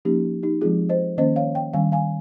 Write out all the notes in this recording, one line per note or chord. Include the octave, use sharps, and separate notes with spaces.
F3 A#3 C#4 D#4 G4
D#4 G4
F3 G#3 C4 F4 G#4
C5 D#5
D#3 A#3 C#4 C5 D#5
C#5 F5
D#5 G5
D#3 G3 C#4 F5 G#5
F5 G#5